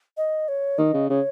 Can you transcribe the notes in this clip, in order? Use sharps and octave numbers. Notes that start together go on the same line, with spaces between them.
D#5
C#5
D#3 D#5
C#3
C#3 C#5